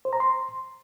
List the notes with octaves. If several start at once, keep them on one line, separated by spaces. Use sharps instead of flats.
C5
A#5
C6